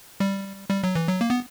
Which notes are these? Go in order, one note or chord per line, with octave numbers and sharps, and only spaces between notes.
G3
G3
F#3
E3
F#3
A#3
B3